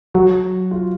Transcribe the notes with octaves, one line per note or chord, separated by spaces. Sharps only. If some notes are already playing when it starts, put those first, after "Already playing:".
F#3 F#4
F4